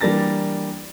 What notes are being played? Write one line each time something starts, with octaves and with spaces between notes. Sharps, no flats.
E3 G3 A#3 D4 A6 A#6